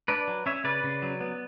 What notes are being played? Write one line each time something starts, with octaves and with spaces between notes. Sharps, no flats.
D4 B4 D5
F#3
C#4 C#5 E5
C#3 B4 D5
C#3
F#3
B3